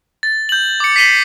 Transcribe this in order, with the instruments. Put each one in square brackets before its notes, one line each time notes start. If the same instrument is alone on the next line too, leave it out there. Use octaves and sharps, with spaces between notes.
[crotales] A6
G6 F#7
D6 C#7
B6 C7 D#7 F#7 G7